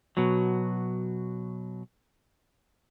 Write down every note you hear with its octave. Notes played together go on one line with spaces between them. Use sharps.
B2 F#3